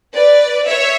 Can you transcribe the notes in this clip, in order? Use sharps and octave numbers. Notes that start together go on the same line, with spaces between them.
B4 D5
C#5 E5